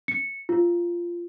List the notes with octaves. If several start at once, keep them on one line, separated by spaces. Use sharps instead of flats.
C#7
F4